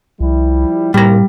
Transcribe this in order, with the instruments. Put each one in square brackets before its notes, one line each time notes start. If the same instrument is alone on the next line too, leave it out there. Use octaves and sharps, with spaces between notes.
[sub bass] C2 [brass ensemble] F3 G3 E4
[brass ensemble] C2 A#3 [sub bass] A2 [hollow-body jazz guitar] G3 A#5